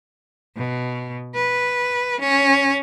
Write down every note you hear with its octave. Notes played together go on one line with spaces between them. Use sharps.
B2
B4
C#4